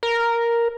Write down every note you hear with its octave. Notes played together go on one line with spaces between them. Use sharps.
A#4